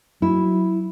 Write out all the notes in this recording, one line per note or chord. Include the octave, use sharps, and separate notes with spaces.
F#3 E4